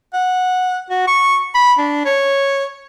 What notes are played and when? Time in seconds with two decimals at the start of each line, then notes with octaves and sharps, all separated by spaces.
0.14 F#5
0.90 F#4
1.07 C#6
1.55 B5
1.78 D4
2.05 C#5